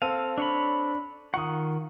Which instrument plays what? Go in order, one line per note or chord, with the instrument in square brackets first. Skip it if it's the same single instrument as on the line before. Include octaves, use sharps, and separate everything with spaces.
[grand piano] C4 A4 D#7 [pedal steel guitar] F5
[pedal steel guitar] D4 C#5 B5
[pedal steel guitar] D#3 F4 F#5 [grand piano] C#6 D#6